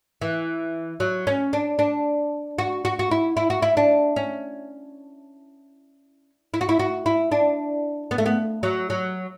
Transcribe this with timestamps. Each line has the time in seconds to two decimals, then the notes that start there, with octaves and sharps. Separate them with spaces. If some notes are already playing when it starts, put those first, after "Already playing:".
0.21 E3
1.00 F#3
1.27 C#4
1.53 D4
1.79 D4
2.58 F#4
2.85 F#4
2.99 F#4
3.11 E4
3.37 E4
3.50 F#4
3.62 E4
3.77 D4
4.16 C#4
6.54 E4
6.61 F#4
6.69 E4
6.79 F#4
7.06 E4
7.32 D4
8.11 B3
8.18 A3
8.26 B3
8.63 F#3
8.90 F#3